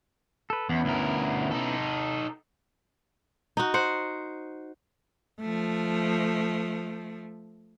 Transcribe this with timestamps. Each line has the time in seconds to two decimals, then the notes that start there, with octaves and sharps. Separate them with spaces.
0.50 A4 B4
0.69 E2 B3 C#4 E4
0.85 D2 A#4
1.51 D#4 A4
3.57 D#4 F#4
3.74 C5 F#5
5.40 F3 A3